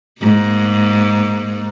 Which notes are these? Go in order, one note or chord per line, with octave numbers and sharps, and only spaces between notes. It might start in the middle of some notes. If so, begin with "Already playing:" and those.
G#2 A#3